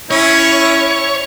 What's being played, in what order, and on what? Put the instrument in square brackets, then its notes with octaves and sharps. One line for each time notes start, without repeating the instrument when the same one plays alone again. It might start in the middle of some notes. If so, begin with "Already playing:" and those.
[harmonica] C#4 E4 [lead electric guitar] C#5